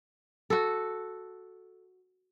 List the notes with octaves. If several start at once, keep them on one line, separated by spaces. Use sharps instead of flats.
F#4 A4